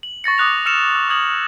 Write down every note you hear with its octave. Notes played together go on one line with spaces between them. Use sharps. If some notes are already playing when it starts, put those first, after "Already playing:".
F#7
C#6 A6 A#6 C#7
D6 D#6 F#6 F7
E6 F6 C#7 E7 F7
E6
D#6 G#6 F#7